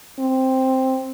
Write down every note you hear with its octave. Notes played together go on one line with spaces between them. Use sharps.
C4